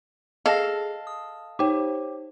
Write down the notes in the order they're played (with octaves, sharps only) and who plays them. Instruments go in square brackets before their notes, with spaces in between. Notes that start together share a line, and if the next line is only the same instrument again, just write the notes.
[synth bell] G#4 [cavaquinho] A4 F5 [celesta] D#5 A#6
[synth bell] D#6
[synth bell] D#4 G4 C5 [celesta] C#5 G5 D6